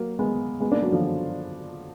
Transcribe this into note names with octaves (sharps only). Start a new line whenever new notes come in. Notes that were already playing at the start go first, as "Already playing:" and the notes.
Already playing: F#3 A#3
G#3 B3
G#3 B3
A#3 D4
F#3 A#3
D3 F3